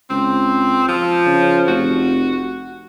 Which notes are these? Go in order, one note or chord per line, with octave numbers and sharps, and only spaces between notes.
C#2 C4
F3
C#3
F1 F#4